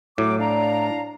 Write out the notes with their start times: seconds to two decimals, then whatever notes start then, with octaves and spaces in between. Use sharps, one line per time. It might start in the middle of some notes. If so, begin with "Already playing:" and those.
0.18 A2 F#3 D6
0.39 D4 D5 F5 A#5